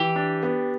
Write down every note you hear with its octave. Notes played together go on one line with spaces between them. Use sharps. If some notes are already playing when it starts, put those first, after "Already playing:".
Already playing: E3 G4
D4
B3